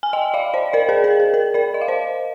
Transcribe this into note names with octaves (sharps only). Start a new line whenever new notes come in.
G#5
D#5 G5
D5 F5
C5 D#5
A#4 D5
G#4 C5
A#4
G#4
A#4
A#4 D5
D#5
F5
C5 D#5